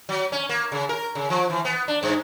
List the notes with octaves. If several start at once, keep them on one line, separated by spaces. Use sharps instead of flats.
F#3
C#4
A#3
C#3
A#4
C#3
F3
E3
B3
D4
G2